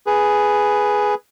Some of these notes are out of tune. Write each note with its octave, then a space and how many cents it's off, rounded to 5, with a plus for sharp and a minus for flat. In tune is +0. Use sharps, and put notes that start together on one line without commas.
G#4 +0 B4 +0